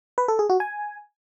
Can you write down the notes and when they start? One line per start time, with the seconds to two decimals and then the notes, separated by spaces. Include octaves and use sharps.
0.18 B4
0.28 A4
0.39 G#4
0.50 F#4
0.60 G#5